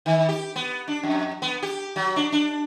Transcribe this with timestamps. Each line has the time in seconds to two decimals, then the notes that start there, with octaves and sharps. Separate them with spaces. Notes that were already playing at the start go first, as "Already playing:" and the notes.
0.06 D#3
0.29 G4
0.56 B3
0.88 D4
1.03 F2
1.42 B3
1.63 G4
1.96 F#3
2.16 D4
2.32 D4